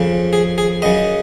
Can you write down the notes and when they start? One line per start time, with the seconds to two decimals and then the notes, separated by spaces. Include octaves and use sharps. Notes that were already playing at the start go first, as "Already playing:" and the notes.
Already playing: F2 C#3
0.33 G#4
0.58 G#4
0.82 F#2 C#3 D#5